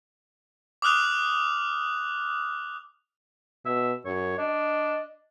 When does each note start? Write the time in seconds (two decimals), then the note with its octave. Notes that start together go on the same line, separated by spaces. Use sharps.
0.82 D6 D#6 F6 F#6 F7
3.66 B2 E5
4.05 F#2 C#5
4.38 D4 D#5